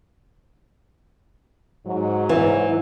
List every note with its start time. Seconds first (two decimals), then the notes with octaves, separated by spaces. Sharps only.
1.86 G#2 F#3
2.29 E3